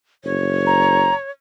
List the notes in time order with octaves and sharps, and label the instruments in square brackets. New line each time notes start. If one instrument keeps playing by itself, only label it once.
[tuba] F#1 [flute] C#5
[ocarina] A#5